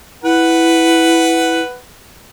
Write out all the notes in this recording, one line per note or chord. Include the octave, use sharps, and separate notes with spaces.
E4 B4 F#5